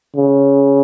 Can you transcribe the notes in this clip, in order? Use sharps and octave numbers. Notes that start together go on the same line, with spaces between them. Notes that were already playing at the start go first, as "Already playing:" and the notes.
C#3